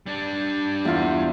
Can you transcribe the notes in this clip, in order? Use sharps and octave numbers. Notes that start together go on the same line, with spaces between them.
G3 D4
E2 F4